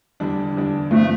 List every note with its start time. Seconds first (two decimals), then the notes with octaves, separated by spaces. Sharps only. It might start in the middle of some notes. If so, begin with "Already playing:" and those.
0.20 E2 D3 G3 D4
0.57 E2 D3 G3 D4
0.91 G2 F3 A3 C4